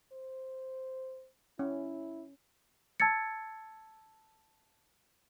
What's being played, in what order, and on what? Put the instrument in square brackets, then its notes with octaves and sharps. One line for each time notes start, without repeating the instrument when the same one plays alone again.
[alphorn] C5
[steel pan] C#4 [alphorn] E4
[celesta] A5 E6 G#6 A6 C#7